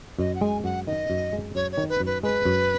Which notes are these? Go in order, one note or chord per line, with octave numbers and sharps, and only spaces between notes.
F#2 D#5
F#5
G#3 G#5
F#2 F#5
D#3 D#5
F#2
G#3
F#2 C#5
C#5
D#3
B4
F#2
B4
G#3 B4
F#2